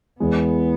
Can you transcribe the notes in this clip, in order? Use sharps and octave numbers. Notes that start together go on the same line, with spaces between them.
E2 E3 G#3 B3